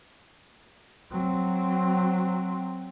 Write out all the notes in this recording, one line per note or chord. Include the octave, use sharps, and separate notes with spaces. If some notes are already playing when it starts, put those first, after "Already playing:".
F#3 C4